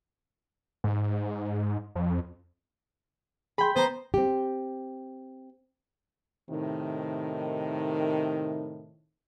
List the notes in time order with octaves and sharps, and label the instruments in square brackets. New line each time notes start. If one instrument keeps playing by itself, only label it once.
[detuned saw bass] G#2
F2
[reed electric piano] G#4 C6 [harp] G5 B5
[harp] B3 [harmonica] C5 [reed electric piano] A#5 B5
[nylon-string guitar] C4 G4
[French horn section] A2 C3 D#3